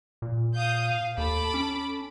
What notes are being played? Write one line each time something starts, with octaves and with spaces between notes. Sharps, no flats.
A#2
F5 D#6 G6
F5
D#2 A4 B5 D6
C#4